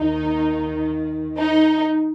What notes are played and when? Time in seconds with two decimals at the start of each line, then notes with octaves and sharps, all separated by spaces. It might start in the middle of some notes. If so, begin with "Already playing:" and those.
Already playing: D#2 D#3 D#4
1.38 D#4